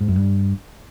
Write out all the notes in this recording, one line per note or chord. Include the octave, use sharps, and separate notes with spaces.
G#2
F#2
G2